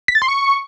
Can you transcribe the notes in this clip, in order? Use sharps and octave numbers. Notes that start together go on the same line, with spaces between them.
B6
A6
C6
C#6